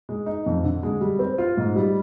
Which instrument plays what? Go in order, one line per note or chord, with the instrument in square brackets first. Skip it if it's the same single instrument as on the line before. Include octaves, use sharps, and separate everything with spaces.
[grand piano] G#3
D#4
F2
D3
G#3
G3
C4
F4
G#2
G3